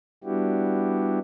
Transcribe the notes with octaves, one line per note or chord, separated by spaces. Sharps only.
G3 B3 D4 E4 F#4 G4